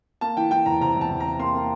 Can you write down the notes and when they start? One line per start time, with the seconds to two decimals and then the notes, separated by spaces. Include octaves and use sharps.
0.21 A#3 A5
0.37 E3 G5
0.51 E3 G5
0.66 E2 A#5
0.81 C3 A#5
0.96 E2 A5
1.11 E2
1.20 A#5
1.25 C3
1.39 A#3 C6
1.55 A#3